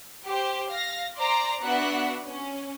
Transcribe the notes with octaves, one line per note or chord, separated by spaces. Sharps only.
G4 C5
F5 A#6
C5 D5 A#5 C6 D6
B3 D4 F#4 E5 F#5 F#6
C#4